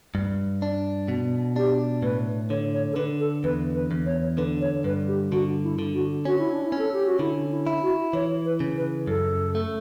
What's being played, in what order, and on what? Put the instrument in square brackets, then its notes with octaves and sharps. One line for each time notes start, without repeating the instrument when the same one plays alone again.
[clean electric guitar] G2
D4
B2
[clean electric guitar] D4 [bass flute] G4
[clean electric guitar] A2 [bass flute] B4
[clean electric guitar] D3 [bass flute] C#5
[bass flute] C#5
A4
[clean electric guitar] D3 [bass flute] B4
[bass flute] A4
[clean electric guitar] E2 [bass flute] B4
[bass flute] B4
[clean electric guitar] E2
[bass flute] C#5
[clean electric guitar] D3 [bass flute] B4
[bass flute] C#5
[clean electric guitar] G2 [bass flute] B4
[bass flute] G4
[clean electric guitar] D3 [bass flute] F#4
[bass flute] E4
[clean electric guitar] D3
[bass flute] F#4
[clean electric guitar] C#4 [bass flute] F#4
[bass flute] E4
D4
E4
[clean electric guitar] C#4
[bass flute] A4
G4
F#4
[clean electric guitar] D3 [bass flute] E4
[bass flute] E4
[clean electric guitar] E4
[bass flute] F#4
[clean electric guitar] E3 [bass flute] C#5
[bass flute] B4
[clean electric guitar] C#3
[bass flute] B4
[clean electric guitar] F#2 [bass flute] A4
[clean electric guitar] A3